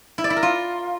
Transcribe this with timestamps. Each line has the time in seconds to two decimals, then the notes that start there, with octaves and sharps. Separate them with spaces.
0.18 E4
0.24 D5
0.30 E4
0.36 A#4
0.43 F4